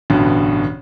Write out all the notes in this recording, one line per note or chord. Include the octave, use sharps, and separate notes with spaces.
A1 G2 B2 D3